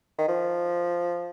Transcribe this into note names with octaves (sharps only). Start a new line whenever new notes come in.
D#3
F3